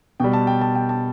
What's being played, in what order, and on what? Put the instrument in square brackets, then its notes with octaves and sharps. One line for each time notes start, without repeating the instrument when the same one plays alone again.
[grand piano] B2 G3 G5
A5
G5
A5
G5
A5